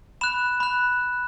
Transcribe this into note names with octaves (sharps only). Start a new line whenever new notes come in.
B5 F#6 E7
B5 F#6